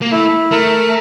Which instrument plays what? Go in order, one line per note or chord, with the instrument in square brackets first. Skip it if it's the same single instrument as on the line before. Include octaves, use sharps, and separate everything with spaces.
[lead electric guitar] A#3
[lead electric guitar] A3 [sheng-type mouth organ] E4
[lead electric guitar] A3 [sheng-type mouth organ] A#4